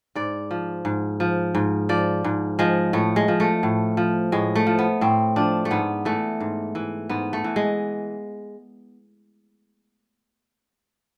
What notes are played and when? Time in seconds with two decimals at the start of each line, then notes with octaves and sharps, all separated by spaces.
0.15 G#2 D5
0.51 F3
0.85 G#2
1.20 F3
1.55 G#2
1.89 F3 D5
2.24 G#2
2.59 F3 G#3
2.93 A2 A3
3.16 G#3
3.28 F3
3.40 A3
3.63 A2
3.97 F3
4.32 A2 G#3
4.56 A3
4.67 F3
4.79 B3
5.01 A2 C4
5.36 F3 D4
5.65 A3
5.71 G#2 B3
6.05 E3 A3
6.40 G#2
6.75 E3
7.10 G#2 B3
7.33 A3
7.44 E3
7.56 G#3